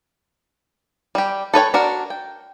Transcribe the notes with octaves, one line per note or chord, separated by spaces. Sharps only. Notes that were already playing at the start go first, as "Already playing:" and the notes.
G3 G4
A4 B4 C#5 G5
D4 F#4 A#4
G5